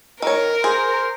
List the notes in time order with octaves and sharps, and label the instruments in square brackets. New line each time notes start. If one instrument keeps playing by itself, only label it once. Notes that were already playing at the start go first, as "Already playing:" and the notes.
[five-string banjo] D#3 C#5 [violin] A#4
[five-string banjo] G#4 [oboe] C5